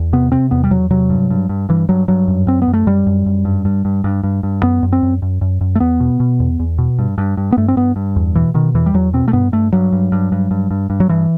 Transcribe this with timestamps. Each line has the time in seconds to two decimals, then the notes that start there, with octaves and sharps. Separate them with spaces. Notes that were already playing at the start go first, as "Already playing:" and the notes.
Already playing: E2
0.13 C3 B3
0.32 C3 C4
0.51 E2 B3
0.64 G3
0.71 E2 F#3
0.90 C3 F#3
1.10 G2
1.30 G2
1.49 G2
1.69 G2 E3
1.89 G2 F#3
2.08 G2 F#3
2.28 F#2
2.47 F#2 C4
2.62 B3
2.68 F#2
2.73 A3
2.87 F#2 G3
3.07 F#2
3.26 F#2
3.45 G2
3.65 G2
3.85 G2
4.04 G2
4.23 G2
4.43 G2
4.63 F#2 B3
4.83 F#2
4.93 C4
5.03 F#2
5.22 F#2
5.41 F#2
5.61 F#2
5.75 A3
5.80 E2 B3
6.00 B2
6.20 B2
6.40 E2
6.60 E2
6.78 B2
6.99 G2
7.18 G2
7.37 G2
7.52 B3
7.57 G2 A3
7.68 C4
7.76 G2 B3
7.96 G2
8.16 E2
8.35 B2 E3
8.54 B2 D#3
8.74 E2 E3
8.86 G3
8.94 E2 F#3
9.13 B2 C4
9.28 A3
9.33 G2 B3
9.52 G2 A3
9.72 G2 F#3
9.93 G2
10.12 G2
10.32 G2
10.51 G2
10.71 G2
10.90 G2
11.00 F#3
11.09 G2 E3